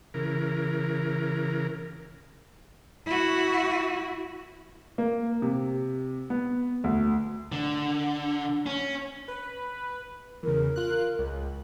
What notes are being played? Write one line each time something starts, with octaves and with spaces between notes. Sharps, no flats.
C#3 E3 A#4
E4 F#4
A#3
C3
B3
D2
D3
C#4
B4
E2 C#3 A#4
F4 F#6
C#2